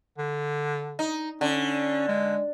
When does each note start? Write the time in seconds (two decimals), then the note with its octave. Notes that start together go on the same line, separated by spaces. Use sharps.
0.18 D3
0.99 D#4
1.41 D3 C#4
2.08 G#3